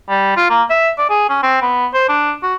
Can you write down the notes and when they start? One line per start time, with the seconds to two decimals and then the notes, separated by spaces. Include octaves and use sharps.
0.09 G3
0.37 F4
0.50 A#3
0.70 E5
0.98 D5
1.10 G#4
1.29 C#4
1.43 C4
1.62 B3
1.94 C5
2.09 D4
2.43 F#4